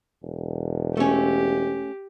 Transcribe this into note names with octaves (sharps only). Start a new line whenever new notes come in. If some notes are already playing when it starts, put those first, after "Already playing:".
E1
A3 C#4 G4